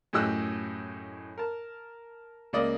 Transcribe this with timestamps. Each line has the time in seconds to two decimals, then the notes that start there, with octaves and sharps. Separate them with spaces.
0.13 F#2 A2 G4 D#5 E6 F#6
1.38 A#4 A5
2.53 C#2 A#3 D5 D#5